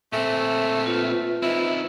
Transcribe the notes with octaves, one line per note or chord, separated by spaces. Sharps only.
A#2 A3 C4
F4 B4
C4 D#4 E4